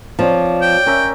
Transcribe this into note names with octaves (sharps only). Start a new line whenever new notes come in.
F3 C4 C#5 D5 A#5
G5
C#4 A#4 E5